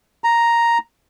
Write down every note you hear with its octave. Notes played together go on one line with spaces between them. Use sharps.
A#5